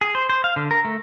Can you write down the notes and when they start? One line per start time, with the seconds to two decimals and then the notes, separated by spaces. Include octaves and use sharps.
0.01 G#4
0.15 C5
0.29 C5
0.44 F5
0.56 D3
0.71 A#4
0.85 A3